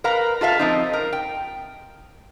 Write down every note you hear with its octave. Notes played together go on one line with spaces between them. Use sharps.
A#4 B4 F5 A#5
F4 A4 E5 F5
F3 C4 D#4
A#4
G5